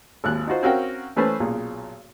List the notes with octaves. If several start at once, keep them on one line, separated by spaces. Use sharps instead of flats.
G#1 D#2 F#6
D#4 F4 F#4 C5
C4 C#4 F#4 A#4 F5 G5
E3 A3 C#4 B4 C5 A5
B1 A#2 G#4